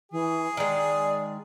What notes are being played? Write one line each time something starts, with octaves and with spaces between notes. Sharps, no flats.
E3 G#4
D#3 G#3 D5